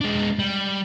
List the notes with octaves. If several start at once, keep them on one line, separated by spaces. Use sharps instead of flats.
G#3 D4
G3